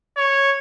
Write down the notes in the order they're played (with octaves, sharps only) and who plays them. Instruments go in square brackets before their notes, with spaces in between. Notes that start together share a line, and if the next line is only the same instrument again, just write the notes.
[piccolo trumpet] C#5